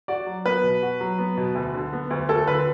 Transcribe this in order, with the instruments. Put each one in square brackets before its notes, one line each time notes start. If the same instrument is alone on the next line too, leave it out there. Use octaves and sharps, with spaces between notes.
[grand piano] F#4 [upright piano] D5
[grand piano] F#3
[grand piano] B3 [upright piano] B4
[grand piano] B2
F#4
F#3
B3
B2
D2
D3
B3
D2
[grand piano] D2 [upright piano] A4
[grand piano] D3 [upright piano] B4